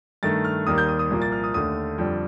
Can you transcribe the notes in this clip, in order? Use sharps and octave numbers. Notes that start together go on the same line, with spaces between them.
G2 D#3 A3 A6
F6
D#2 D#3 G3 A#3 D#6
G6
D#6
D#6
C2 A#2 F3 A#3
A6
F6
D#6
D#2 D3 A3 D#6
F2 D3 G3